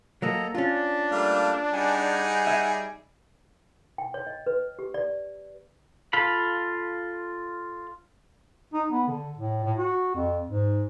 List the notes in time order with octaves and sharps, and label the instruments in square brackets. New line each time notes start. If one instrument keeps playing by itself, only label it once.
[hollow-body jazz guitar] F#3 A#3 F#4 [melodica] A4 D#5 A#5
[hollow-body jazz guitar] C#4 F4 [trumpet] D4 [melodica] D5
[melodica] G3 A#3 [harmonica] A3 D5 F5
[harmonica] G3 D#4 G#4 [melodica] F#5 G#5
[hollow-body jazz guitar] E5
[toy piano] G5
C#5
D#5
B4
G4
D5
[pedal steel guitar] F4 A4 F5 B5
[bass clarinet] D#4
B3
D3
A2
A2
F#4
F2
G#2